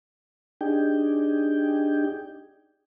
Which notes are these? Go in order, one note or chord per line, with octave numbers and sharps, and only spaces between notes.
D4 D#4 G4 G#4 G5